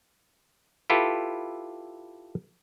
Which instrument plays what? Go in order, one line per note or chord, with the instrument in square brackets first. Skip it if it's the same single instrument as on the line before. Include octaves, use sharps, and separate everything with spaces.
[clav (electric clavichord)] E4 F4 G4 A4 B4